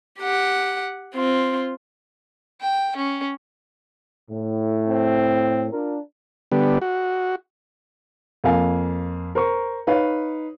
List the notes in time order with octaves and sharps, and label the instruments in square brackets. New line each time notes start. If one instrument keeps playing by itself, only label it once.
[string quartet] G4 F#5
C4 F4
[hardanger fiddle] G5
C#4
[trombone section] A2
[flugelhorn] C4
[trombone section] D4 F4 A#4
[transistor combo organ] D3 G3 B3
F#4
[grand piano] F2 A#3 F5 G#5
A#4 C5 A#5 C#6
D#4 B4 C#5 F5